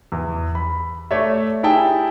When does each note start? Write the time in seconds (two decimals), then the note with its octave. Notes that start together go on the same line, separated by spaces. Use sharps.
0.12 E2
0.55 B5
1.11 A3 C#5 D5 E5
1.63 E4 G4 G#4 E5 G5 A5